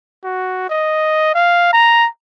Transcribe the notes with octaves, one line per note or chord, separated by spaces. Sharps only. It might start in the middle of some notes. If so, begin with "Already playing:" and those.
F#4
D#5
F5
A#5